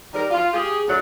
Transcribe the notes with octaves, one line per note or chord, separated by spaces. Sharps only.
D#3 G3 A#4
F4
G4 G#4
D2 A2 F#3 D4 C#5